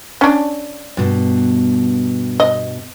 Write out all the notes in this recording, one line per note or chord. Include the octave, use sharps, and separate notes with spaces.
C#4 D4
G2 B2
D#5